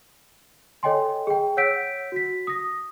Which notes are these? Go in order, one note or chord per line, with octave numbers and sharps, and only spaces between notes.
A4 C#5 D#5 G5 G#5 C6
G#4 G5
C#5 F#5 E6 G6 B6 D7
F#4 B6
D#6 A#6